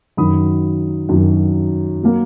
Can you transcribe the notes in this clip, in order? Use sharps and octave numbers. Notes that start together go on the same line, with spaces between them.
F#2 D#3 F#3 B5 D#6
F#2 D#3 F#3
F#3 A#3